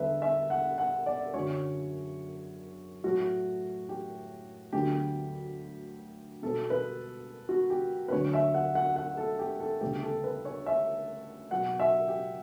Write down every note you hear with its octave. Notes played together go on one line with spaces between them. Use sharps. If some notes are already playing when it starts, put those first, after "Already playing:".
Already playing: E2 D3 G3 B3 A4 B4 E5
E5
F#5
F#5
D5
F#2 D3 F#3 C#5
A2 F#3 A3 F#4
G4
D2 D3 F#3 B3 G4
B2 G3 B3 A4
B4
F#4
G4
B4
D2 D3 F#3 C#5
E5
F#5
F#5
F#5
A4
G4
A4
D2 C#3 G3 B3 G4
A4
B4
C#5
E5
B2 F#3 B3 F#5
E5
G4